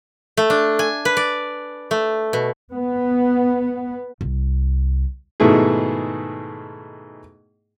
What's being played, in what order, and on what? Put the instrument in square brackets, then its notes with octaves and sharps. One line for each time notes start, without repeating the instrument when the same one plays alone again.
[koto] A3
D4
G#5
B4
D5
A3
B2
[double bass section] B3
[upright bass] C2
[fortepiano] G#2 B2 D#3 A3 E4 G#4